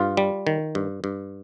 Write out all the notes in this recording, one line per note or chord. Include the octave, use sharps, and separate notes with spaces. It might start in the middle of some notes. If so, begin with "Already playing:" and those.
Already playing: G2 F4
G3
D#3
G2
G2